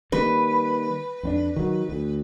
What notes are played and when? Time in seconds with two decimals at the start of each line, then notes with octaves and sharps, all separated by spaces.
0.12 D#3 G3 A#3 B4
1.23 F2 C4 D4
1.56 D#3 F#3
1.89 D2